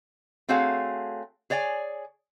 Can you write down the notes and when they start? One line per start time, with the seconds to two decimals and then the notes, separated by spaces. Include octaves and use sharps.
0.49 A3 C4 F#4 G#4 C#5 F5
1.50 G#4 C#5 D5 F#5 G#5